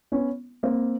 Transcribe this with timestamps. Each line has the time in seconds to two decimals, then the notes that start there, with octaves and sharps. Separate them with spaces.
0.12 B3 C#4
0.63 A#3 C4